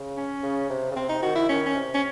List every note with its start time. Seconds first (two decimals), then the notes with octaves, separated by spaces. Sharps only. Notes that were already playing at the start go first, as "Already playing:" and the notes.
Already playing: C#3
0.17 C#4
0.43 C#3
0.70 C3
0.91 C#3
0.96 C3 C4
1.09 D#4
1.22 D#3 F#4
1.35 E4
1.49 D#3 C#4
1.66 C#4
1.75 C3
1.94 C#4